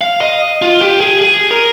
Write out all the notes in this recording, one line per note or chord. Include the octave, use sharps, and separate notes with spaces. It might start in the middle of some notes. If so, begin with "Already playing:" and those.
F5
D#5
F4
G4
G#4
G#4
A#4